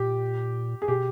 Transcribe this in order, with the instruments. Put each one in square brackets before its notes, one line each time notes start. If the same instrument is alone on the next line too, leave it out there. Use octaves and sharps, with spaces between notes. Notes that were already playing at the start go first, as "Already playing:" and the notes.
Already playing: [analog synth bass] A#2 [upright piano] G4
[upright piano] G#4
[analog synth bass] B2 [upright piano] G4